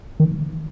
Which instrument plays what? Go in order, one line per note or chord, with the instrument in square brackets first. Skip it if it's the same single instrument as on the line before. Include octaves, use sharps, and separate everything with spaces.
[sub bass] D#3